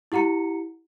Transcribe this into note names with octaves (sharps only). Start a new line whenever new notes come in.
E4 G4 F#5 A#5 C#7